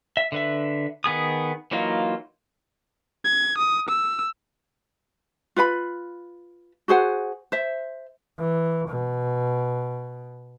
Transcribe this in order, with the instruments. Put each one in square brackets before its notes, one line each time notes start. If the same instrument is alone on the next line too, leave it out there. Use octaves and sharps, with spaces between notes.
[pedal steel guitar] E5
D3 B4 E5
D#3 B3 G#4 D#6
E3 F#3 A#3 D#4 F4
[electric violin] G#6
D#6
E6
[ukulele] F4 B4 F#5 B5
F#4 G#4 C5 F#5
C5 E5
[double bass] E3
B2